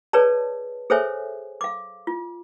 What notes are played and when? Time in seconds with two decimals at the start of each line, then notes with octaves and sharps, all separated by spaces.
0.13 G#4 B4 C#5 D5 A5
0.90 G#4 A4 C5 C#5 E5 G#5
1.61 F5 D6
2.07 F4